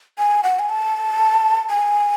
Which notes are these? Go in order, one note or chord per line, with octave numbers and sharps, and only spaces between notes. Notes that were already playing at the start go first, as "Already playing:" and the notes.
G#5
F#5
G#5
A5
G#5